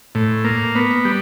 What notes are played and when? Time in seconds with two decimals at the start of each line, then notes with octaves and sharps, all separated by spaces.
0.15 A2
0.44 A#3
0.75 B3
1.05 G3